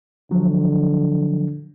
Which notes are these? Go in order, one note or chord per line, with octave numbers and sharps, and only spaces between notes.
D3 F3 F#3